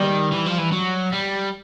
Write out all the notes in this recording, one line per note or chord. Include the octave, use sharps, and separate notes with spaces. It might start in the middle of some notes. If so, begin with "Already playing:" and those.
Already playing: D#3 G3
E3
F3
E3
F#3
G3